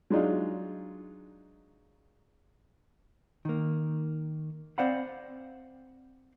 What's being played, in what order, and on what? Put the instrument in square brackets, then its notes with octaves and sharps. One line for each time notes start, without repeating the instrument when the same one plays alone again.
[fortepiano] F#3 G#3 D4 D#4 F4
[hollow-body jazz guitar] D#3 A#3
C4 C5 D5 F5 F#5 B5